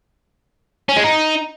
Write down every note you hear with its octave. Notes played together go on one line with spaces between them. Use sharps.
C#4
G#3
D#4